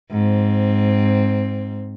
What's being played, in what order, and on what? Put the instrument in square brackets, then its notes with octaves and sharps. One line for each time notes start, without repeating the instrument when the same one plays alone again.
[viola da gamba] G#2 C4